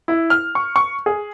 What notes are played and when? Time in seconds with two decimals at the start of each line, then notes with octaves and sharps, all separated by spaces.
0.08 E4
0.30 F6
0.55 C#6
0.76 C#6
1.06 G#4